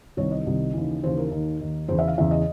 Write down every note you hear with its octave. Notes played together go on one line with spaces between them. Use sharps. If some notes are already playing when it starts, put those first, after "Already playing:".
C2 C3 D#3 C#5
D#5
C2 C3 D#3
D#2 C#3 E3
D#2 C#3 E3 C5
A#4
D#2 D#3
D#2 D#3
E2 C#3 E3 C5
E5
F5
E2 C#3 E3 E5
D#5